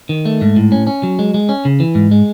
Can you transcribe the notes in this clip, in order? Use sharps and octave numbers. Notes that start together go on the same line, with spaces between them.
D#3
A3
G#2
A2
C#4
C#4
F#3
G#3
G#3
C#4
C#3
E3
G#2
G#3